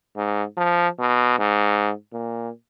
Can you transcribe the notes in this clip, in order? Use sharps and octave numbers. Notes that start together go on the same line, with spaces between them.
G#2
F3
B2
G#2
A#2